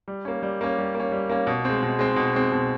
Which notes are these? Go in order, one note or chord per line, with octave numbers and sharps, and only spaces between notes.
G3
A#3 C#4
G3
A#3 C#4
G3
A#3 C#4
G3
A#3 C#4
B2
G#3 C4
B2
G#3 C4
B2
G#3 C4
B2